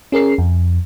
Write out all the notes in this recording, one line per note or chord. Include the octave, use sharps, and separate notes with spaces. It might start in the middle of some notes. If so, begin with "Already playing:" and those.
C#4 G#4 A#4 C7
F2